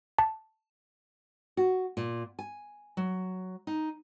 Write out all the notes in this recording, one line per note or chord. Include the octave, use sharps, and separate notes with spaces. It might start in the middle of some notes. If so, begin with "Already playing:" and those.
A5
F#4
A#2
G#5
F#3
D#4